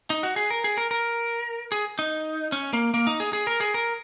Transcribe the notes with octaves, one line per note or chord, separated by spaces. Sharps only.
D#4
F#4
G#4
A#4
G#4
A#4
A#4
G#4
D#4
C#4
A#3
A#3
D#4
G#4
G#4
A#4
G#4
A#4